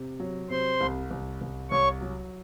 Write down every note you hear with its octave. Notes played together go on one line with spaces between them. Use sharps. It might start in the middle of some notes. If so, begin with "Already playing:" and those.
Already playing: C3
F#3
C3 C5 C6
C2
C2
C2
C2 C#5 C#6
F#3